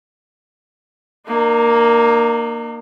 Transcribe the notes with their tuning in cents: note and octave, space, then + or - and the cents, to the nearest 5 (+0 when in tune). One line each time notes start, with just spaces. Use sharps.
A#3 +0 D#4 -45